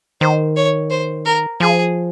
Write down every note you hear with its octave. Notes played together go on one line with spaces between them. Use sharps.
D#3 C5
C#5
C5
A#4
F3 G#4